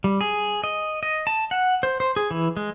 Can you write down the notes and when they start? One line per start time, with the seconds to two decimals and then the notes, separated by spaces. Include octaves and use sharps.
0.04 G3
0.21 G#4
0.64 D#5
1.03 D#5
1.27 A5
1.51 F#5
1.83 C5
2.00 C5
2.16 G#4
2.31 E3
2.57 G#3